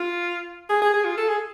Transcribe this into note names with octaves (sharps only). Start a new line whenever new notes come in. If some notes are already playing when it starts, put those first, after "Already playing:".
Already playing: F4
G#4
G#4
G#4
F4
A4
G#4